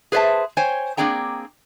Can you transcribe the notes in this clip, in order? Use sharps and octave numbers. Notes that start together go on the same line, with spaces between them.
G#4 B4 C5 D5 E5 A5
C5 C#5 G5 G#5
A#3 C4 D4 G#4 G5 A#5